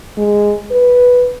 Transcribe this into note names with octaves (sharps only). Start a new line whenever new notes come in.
G#3
B4